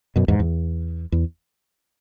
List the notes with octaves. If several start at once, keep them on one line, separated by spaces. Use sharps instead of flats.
F#2 B2
E2 G#2
E2
E2